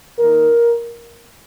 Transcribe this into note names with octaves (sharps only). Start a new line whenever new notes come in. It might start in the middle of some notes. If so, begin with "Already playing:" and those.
D#3 A#3 D#4 A#4